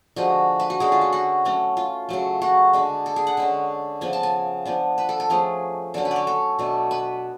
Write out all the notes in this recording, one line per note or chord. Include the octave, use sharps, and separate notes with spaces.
D3 F3 G#3 F#4
B4
F#4
D3 G#3 C#4 G#4
F4
F#4
F#4
F#3 A3 C#4
F4
C#3 F#3 A3
F#4
D3 G#3 D4
A4
G#4
F#5
D3 G#3 C#4
C#3 F3 B3 G#5
A5
G#5
F3 B3 D4
B4
A4
A4
F3 A3 C#4 G#4
D3 F#3 C#4 A4
B4
C#5 D5
A4
B2 A3 D4
B4